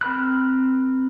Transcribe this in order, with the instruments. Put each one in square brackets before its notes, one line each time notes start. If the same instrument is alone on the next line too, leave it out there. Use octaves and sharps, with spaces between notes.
[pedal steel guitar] C4 A#4 B5 F#6